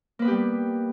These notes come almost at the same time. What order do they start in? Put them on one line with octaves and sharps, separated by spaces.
A#3 B4 B3 G4 G3